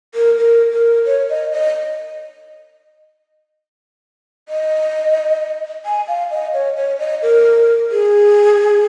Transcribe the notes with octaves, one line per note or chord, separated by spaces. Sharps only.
A#4
A#4
A#4
C#5
D#5
D#5
D#5
G#5
F5
D#5
C#5
C#5
D#5
A#4
G#4